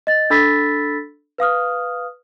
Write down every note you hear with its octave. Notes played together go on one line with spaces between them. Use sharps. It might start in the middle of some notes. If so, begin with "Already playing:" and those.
D#5 A6
D4 A4 B5 E6 A6 B6
B4 F5 D#6 F6